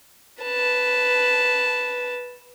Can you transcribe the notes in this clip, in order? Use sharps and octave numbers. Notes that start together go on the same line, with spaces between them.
B4 A5